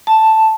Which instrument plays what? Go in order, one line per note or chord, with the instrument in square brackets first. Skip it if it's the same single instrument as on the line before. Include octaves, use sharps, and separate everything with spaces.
[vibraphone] A5